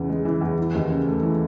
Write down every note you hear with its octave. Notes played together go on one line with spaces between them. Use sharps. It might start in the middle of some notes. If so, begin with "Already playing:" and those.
Already playing: E2 C#3 E3
G#3
E3
E2
E3
D#2
C#3
A3
E3